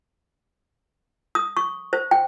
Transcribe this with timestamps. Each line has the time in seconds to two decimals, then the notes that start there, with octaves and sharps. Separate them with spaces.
1.35 D#6
1.57 C#6
1.93 C5
2.11 G5